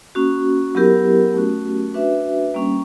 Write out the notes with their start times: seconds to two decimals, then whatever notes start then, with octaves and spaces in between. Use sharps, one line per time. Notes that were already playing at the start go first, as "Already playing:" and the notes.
0.15 A#3 C#4 F#4
0.75 F#3 B3 E4 G4 A#4
1.34 A3 C#4 F#4
1.94 D4 F#4 B4 E5
2.54 G3 A#3 C#4